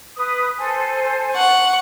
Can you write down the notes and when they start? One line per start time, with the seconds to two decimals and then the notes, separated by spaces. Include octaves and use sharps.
0.16 B4 D#6
0.58 A4 C5 G#5
1.35 F#5 C#6